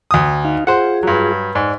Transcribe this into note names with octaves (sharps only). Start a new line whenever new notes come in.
D2 D#6
D#4 F5
F4 G#4 C5 F#5
G2 F#3
G#2 D5